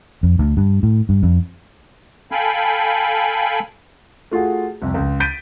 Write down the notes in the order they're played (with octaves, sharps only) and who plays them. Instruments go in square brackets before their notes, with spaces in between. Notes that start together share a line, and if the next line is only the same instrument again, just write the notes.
[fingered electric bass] F2
D2
G2
A2
G2
F2
[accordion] A4 F5 G5 G#5 B5
[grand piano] A3 F4 F#4 G#4
C2 F2
C#2
G6 A6 B6 D7 D#7